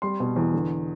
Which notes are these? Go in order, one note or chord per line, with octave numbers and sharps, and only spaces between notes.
G3 C6
B2
E2
D3